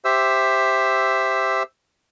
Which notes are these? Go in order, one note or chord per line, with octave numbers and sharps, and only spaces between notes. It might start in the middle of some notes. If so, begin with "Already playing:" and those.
G4 C5 E5 E6